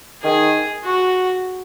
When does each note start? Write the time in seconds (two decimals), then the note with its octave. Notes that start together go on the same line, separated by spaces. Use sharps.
0.24 D#3 G#4
0.84 F#4